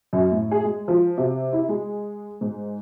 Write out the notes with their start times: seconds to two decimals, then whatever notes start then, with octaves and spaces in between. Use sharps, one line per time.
0.13 F#2
0.32 A2
0.51 G#4
0.64 G#3
0.88 F3
1.18 C3
1.53 E4
1.69 G#3
2.41 G#2